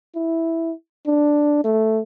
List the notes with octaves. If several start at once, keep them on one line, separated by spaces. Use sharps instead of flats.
E4
D4
A3